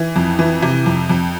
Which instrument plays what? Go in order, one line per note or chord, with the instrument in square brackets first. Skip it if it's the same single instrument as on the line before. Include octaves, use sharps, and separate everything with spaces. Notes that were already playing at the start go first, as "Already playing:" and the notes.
Already playing: [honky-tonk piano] E3
F2
E3
C3
F2
F2